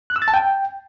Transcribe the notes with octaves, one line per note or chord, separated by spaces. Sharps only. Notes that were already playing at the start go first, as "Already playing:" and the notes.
F#6
E6
A6
A5
G5